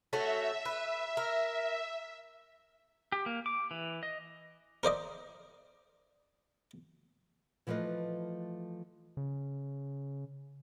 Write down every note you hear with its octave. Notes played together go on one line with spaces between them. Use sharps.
A3 C#4 F#4 E5
B4
A#4
G4
A#3
D6
E3
D#5
A#4 C5 D5 D#5
E3 F3 A3 F4 B4 D#5
C#3